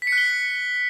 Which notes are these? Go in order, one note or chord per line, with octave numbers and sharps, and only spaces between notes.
B6
C#7
F#6
G7